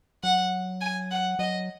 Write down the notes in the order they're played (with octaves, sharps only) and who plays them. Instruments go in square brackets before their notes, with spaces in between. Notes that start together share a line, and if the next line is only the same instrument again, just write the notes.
[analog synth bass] F#3 [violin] F#5
[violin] G#5
F#5
[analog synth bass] F#3 [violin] D#5